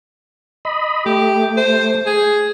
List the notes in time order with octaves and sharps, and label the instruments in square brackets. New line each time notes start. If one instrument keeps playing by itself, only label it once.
[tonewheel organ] D#5 B5
[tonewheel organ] A3 [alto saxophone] G4
[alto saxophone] C5
G#4